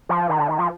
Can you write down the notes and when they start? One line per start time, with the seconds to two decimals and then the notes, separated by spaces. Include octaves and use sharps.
0.09 F3
0.29 D#3
0.39 D3
0.49 D#3
0.59 F3